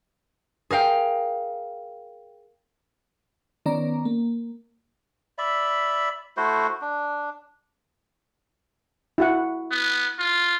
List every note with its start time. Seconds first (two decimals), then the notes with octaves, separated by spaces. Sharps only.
0.70 G#4 A#4 F5 G5
3.66 D#3 B3 C#4 D5 A#5
4.05 A#3
5.38 D5 E5 B5
6.37 A3 E4 F#4 C5
6.81 D4
9.18 E4 F#4 F#5
9.71 B3
10.19 F4